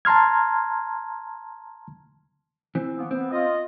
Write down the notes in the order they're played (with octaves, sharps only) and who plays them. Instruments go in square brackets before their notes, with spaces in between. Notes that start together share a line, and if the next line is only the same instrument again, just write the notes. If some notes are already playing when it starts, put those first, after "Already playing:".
[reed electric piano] A5 A#5 C6 F6 G#6
[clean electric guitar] E3 C4
[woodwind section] F3 A#3 B3
[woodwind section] B3 [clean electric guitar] C4
[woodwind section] F4 D#5